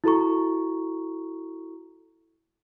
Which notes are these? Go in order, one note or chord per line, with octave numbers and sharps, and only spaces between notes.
E4 F#4 A4 A#5 C#6